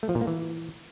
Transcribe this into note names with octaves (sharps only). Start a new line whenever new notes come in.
A3
F3
A#2
A#3
E3